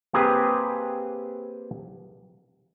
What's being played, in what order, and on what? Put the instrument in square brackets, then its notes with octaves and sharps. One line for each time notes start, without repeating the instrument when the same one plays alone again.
[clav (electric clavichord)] A#3 C4 G4 G#4 B4